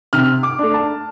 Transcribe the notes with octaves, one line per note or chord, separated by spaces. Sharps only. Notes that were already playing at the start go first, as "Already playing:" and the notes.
C3 F6
D6
A3 D4
A5